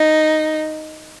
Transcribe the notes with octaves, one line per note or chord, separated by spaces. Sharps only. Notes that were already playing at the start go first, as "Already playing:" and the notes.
Already playing: D#4